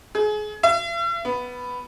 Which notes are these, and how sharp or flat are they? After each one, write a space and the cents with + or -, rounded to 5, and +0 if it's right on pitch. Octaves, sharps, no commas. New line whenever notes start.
G#4 +30
E5 +45
B3 +5